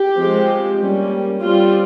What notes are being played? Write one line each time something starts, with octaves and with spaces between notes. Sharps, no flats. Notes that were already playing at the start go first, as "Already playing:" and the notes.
Already playing: G4
F3 G#3 C4
G3 A#3 C#4
G3 C4 F4